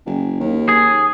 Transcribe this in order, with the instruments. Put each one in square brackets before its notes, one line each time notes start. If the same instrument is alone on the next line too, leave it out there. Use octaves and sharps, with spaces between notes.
[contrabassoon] F#1
D#2
[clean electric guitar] G#4